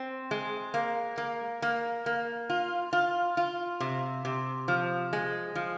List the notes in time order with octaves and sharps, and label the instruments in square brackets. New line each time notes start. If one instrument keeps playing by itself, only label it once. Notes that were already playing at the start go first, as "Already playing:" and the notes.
Already playing: [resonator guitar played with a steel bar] C4
G#3
A#3
A#3
A#3
A#3
F4
F4
F4
C3
C3
F3
G#3
F3